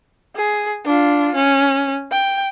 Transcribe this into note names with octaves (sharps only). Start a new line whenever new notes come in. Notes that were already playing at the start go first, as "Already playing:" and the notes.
G#4
D4 F4
C#4
G5